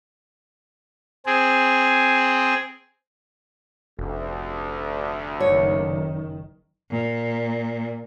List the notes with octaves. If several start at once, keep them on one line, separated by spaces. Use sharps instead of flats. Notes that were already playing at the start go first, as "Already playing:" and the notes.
C4 G#4
F1 D2
F#1 D#3 C#5
A#2